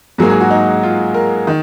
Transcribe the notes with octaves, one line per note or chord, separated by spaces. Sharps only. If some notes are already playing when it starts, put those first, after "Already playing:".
G#2 F#3 A#3 G#4
G#4
F#4
D#4
F4
A#4
D#3